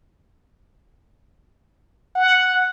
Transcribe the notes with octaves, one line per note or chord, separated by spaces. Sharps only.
F#5